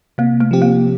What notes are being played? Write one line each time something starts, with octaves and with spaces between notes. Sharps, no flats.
C3 A#3
A3
F3 C4 G4
A#3